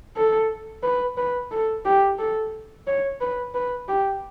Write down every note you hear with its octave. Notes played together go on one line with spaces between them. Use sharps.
A4
B4
B4
A4
G4
A4
C#5
B4
B4
G4